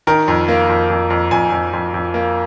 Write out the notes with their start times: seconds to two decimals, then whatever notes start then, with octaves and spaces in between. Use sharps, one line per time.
0.07 D#3 A#4
0.28 F2
0.48 A#3
0.69 F2
0.90 F2
1.10 F2
1.31 F2 G#5
1.52 F2
1.73 F2
1.94 F2
2.14 A#3